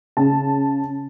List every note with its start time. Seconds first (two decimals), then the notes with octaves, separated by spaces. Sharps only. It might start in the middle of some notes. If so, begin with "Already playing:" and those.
0.17 C#3 A5